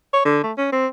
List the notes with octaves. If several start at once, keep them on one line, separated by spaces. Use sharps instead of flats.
C#5
D3
A3
C#4
C4